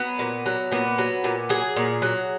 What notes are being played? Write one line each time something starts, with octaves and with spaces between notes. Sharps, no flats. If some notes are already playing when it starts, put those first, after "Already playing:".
Already playing: F#3 B3
A#2
F#3
A#2 B3
F#3
A#2
F#3 G#4
A#2
F#3